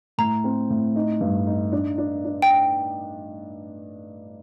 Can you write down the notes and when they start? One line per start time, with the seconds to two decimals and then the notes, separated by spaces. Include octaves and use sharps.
0.18 A2 A#5
0.44 C4
0.70 A2
0.96 D#4
1.21 G2
1.47 D#4
1.72 D4
1.98 D4
2.25 D4
2.42 G5